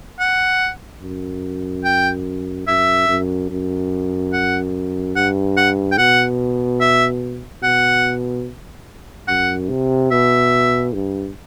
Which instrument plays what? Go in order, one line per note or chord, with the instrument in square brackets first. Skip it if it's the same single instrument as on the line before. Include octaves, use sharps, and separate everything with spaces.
[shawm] F#5
[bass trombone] F#2
[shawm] G5
[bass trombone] F#2 [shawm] E5
[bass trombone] F#2
F#2
[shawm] F#5
[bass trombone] G2 [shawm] F#5
[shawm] F#5
G5
[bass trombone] B2 [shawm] F#5
[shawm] E5
[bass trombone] B2 [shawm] F#5
[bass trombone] F#2 [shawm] F#5
[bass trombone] C3
[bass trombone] B2 [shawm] E5
[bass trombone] G2